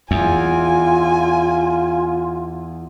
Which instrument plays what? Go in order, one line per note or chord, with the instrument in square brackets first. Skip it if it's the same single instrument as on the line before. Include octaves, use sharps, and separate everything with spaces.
[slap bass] E2 [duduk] F4 [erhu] G#5